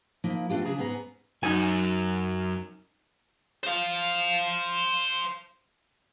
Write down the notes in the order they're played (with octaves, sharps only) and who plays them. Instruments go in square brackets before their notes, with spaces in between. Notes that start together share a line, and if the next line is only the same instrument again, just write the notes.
[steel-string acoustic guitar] F3 A#3 D#4 E4
A3 B3 D4 F4 G4
C#3 D4 G#4 A#5
G#2 B3 G#4 A#5
[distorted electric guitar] F#2 [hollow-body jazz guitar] D#4 G#5
[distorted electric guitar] C5 F5